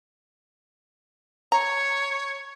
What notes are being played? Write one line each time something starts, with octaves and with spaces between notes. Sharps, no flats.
C#5 A#5